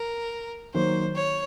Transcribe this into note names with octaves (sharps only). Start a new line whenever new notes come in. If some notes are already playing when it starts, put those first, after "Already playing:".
Already playing: A#4
D#3 F#3 A#3 C5
C#5